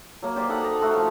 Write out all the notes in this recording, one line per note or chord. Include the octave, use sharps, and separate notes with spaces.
F#3 A#3
G4 C5 D5
D#4 A4 F#5 A#5
A5 A#5
A3 F#4 A4 C5
F3 G4 F5